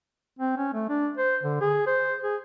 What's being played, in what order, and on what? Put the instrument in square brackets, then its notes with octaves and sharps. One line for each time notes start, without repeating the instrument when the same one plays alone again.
[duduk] C4
C#4
A3
D4
C5
D3
G#4
C5
G#4